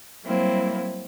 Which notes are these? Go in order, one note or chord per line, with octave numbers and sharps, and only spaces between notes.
F#3 G3 A#3 C4 E4